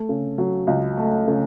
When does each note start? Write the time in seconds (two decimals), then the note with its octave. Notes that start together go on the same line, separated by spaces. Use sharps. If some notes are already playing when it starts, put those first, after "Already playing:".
Already playing: A3
0.09 C#3
0.38 F#3
0.67 C#2
0.97 A3
1.28 C#3